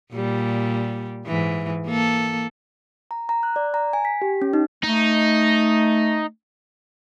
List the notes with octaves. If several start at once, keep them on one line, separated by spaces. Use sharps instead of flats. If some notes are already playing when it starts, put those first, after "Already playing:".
A#2 G3
G#2 E3
A#3 A4
A#5
A#5
F#6
D5
A#5
G#5
B6
G4
C#4
D#4
A3 D#4